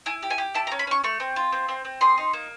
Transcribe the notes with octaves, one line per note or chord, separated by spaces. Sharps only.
E4 G#5
G4
G#5
G4
E4 A5
A#5
C#4
B5
C#4 C#6
A3 C#6
C4
F4
C4
C4
C4
G#4 C6
D#4
A#3